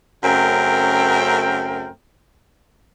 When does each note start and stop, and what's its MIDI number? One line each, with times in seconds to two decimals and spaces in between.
0.24 1.89 42
0.24 1.89 49
0.24 1.89 57
0.24 1.89 60
0.24 1.89 70
0.24 1.89 79